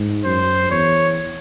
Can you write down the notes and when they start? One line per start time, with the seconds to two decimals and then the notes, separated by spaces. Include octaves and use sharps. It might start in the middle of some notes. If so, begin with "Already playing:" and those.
Already playing: G#2
0.25 F#2 C5
0.71 E2 C#5